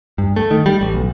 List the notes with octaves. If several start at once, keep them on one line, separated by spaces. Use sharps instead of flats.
G2
A3
D#3
G3
A1
B1